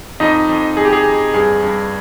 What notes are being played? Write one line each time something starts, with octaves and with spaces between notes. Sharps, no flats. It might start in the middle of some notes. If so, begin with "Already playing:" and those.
F2 D#4 D#5
F2
F2 G#4
G4
G#4
F2
G2 G#4
G2